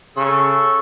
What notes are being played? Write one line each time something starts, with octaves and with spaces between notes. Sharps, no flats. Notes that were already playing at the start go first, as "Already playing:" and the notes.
C#3 A4 C#6